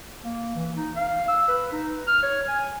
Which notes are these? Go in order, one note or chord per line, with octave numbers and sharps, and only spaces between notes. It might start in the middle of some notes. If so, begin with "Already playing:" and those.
A#3
E3
D#4
F5
E6
B4
D#4
F6
C#5
G#5